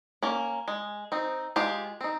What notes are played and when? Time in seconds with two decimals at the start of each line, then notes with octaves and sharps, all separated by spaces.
0.23 A#3 C#4
0.68 G#3
1.12 C4 D#4
1.56 G#3 F4 G4
2.01 C4 D#4